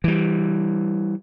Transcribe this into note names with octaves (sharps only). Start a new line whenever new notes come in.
E3 G3